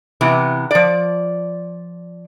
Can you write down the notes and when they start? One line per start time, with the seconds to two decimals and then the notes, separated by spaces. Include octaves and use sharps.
0.21 C3 E3 B3
0.71 F3 D5